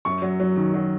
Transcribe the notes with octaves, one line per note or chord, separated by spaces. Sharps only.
F#2 C#6
F#3
F#3
D#3
F#3